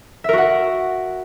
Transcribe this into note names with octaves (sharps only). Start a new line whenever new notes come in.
F#4 A#4 E5 F#5